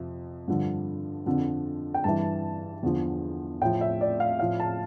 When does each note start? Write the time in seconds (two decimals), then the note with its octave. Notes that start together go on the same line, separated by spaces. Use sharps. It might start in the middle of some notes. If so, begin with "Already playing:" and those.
Already playing: F2 C3 F3
0.48 G2 D3 F3
1.26 F2 D3 F3
1.94 G5
2.04 G2 E3 A5
2.83 E2 D3 F3
3.61 A2 F3 G5
3.81 E5
4.01 D5
4.20 F5
4.39 A2 F3 F5
4.60 A5